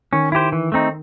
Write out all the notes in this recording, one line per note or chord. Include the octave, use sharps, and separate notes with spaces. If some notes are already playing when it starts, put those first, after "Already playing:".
D#3 C#4
E4 G4 C5
E3
A3 C4 D#4